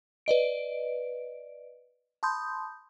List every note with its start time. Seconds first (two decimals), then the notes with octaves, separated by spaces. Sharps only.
0.26 B4 D5 D#5 D7
2.23 A5 B5 C6 D#6 G6